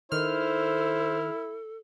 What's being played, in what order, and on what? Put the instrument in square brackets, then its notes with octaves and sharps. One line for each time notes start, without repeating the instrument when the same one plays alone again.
[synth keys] D#3 F6 [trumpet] E4 [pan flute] A4 [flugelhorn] C5